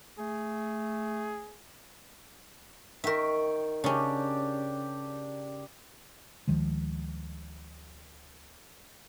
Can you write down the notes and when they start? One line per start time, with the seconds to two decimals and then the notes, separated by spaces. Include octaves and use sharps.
0.19 A3 G#4
3.04 D#3 A#4 E5 G5 C#6
3.84 C#3 C#4 D4 G4
6.48 D2 D#3 F3 G#3